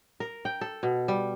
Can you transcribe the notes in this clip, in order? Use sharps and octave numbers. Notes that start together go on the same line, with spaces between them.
A#4
G5
A4
B2
G3